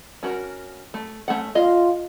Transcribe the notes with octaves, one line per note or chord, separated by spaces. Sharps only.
C#4 F#4 A#4
A3
A3 C#4 F#5
F4 D#5 F5